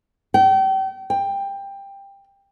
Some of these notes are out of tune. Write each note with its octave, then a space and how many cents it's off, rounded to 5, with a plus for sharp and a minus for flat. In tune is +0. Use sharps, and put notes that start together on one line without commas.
G5 -35
G5 +15